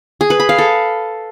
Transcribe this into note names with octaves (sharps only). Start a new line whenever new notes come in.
G#4
B4
B5
F5
A4